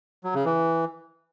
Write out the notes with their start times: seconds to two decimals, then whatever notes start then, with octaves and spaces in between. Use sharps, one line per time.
0.24 F#3
0.35 C#3
0.45 E3